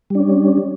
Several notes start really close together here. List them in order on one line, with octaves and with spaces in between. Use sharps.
G3 D4 C#4